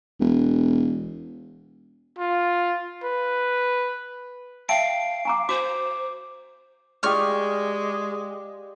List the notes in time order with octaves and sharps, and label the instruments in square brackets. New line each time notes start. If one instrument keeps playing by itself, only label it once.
[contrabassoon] E1
[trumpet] F4
B4
[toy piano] E5 G5 A5 [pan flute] F5 [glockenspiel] C7 D7
[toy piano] G#5 A#5 D6
[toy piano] F#4 [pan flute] C5 [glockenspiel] D6
[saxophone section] G#3 [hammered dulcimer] G4 D5 F5 [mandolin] C#6 F6